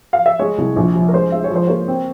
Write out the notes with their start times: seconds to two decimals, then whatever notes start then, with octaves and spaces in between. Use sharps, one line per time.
0.13 F5
0.26 E5
0.39 G#3 C#5
0.58 C2
0.76 A#1
0.95 F3
1.08 A#4
1.13 G#3 C5
1.32 G#3 E5
1.44 C#5
1.51 F3 C5
1.67 A#3 C#5
1.88 C4